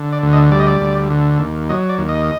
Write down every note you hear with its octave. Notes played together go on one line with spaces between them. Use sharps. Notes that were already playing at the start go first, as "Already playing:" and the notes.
Already playing: D3
D5
D2
D#5
G3 D5
D#5
D5
D2
D3
D#2
F#3 D#5
D5
D#2
D#5